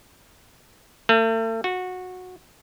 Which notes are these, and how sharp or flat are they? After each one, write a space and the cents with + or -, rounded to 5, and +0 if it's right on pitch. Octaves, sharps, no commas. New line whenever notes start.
A3 +40
F#4 -15